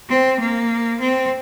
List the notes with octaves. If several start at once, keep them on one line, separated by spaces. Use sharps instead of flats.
C4
A#3
C4